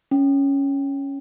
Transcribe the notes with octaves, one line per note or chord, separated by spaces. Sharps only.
C#4